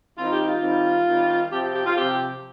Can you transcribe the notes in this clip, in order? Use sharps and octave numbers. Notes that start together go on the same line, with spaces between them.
D#3 G3 C4 D#4 F4
G4
F4
D#3 G3 C4 D#4
D#3 G3 C4 D#4
C3 F3 C4 G4
G4
G4
F4
C3 F3 C4 G4